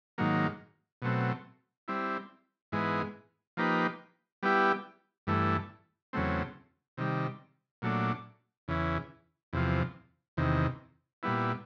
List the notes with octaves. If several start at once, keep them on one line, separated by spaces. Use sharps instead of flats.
G#2 D#3 F#3 A#3
B2 F#3 A3 C4
G3 C4 E4
G#2 E3 G#3 B3
F3 A#3 D#4 G4 B4
G3 B3 E4 G4
G2 E3 A3
E2 C#3 F#3 A3 C4
C3 D#3 G3
A#2 F#3 A3 D4
E2 C#3 E3
E2 C3 F3
E2 C3 D#3
A#2 G3 B3 E4